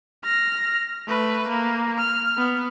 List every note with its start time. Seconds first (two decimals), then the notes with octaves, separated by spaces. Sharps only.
0.24 F6 A#6
1.08 A3 B4
1.49 A#3
1.98 F6
2.38 B3